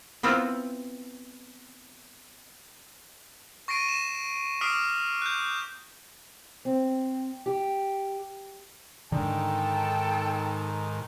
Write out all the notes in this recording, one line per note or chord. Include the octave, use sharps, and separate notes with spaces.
B3 C4 E4 F4
C#6 A#6 C7 D7 D#7
E7
D6 D#6 F6 B6 C7 D7
F#6 G6
C4
G4
G#2 D3 D#3 A4 G5